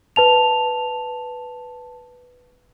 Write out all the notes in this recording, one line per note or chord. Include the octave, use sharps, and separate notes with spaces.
B4 A5 F7